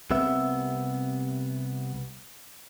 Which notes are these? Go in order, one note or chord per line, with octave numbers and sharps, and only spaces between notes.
C2 C3 B3 E5